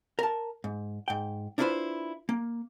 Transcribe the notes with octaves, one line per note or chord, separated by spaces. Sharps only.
A#4 A5
G#2
G#2 G5
D4 E4 F4 G#4 B4 C5
A#3